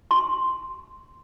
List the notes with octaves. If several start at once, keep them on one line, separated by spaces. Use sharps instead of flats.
C6